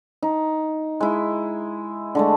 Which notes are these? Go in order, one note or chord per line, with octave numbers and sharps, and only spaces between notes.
D#4
G#3 E4
D3 G#3 A3